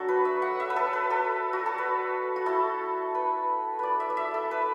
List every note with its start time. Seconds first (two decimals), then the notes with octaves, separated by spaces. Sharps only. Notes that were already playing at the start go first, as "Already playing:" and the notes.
Already playing: F#3 D4 F#4 A4
0.09 B4
0.25 E5
0.42 F#5
0.60 E5
0.70 B4
0.76 A4
0.93 B4
1.10 A4
1.53 F#4
1.66 A4
1.78 B4
2.36 F#4
2.46 A3 E4 A4
3.15 B4
3.79 B4 D5
4.00 E5
4.10 D5
4.17 E5
4.34 A4
4.51 B4